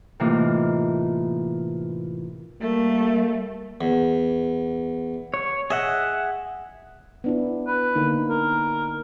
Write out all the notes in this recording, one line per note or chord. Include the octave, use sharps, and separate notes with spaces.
A2 C3 E3 A#3 D#4 F4
G3 A3 A#3
E2
C#5
G#4 D#5 E5 F#5
B3 D4 E4
B4
D3 A#3 D#4
A#4